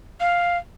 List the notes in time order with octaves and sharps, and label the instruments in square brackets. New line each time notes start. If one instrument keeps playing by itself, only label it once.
[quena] F5